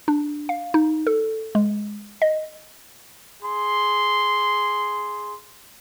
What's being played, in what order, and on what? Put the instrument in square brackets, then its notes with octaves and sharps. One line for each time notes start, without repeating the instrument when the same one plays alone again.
[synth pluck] D4
F5
D#4
A4
G#3
D#5
[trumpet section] G#4 C6